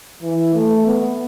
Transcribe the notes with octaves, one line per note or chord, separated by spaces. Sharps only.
E3
A3
B3